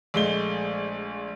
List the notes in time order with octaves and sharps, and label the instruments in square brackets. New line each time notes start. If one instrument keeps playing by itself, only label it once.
[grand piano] A#1 G#3 A3 G7